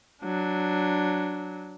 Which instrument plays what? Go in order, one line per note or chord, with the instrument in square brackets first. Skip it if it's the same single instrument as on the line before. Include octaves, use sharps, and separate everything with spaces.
[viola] F#3 D4